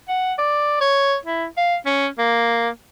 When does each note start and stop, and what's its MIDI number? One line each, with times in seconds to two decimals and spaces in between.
0.08 0.33 78
0.38 0.78 74
0.81 1.16 73
1.25 1.46 64
1.57 1.76 77
1.86 2.07 61
2.18 2.69 58